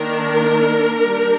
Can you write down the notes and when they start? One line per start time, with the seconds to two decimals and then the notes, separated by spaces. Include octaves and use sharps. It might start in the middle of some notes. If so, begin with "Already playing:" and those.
Already playing: D#3 A#3 D4 A#4
1.02 G3 D4